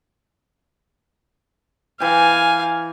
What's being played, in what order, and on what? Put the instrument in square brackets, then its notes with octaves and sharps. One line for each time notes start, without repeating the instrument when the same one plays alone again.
[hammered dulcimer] E3 G5 [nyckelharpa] F5 G#5